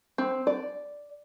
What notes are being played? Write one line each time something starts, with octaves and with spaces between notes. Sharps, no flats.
C4
D5